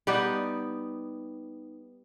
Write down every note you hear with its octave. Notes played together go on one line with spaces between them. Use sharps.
G3 B3 D#4 G4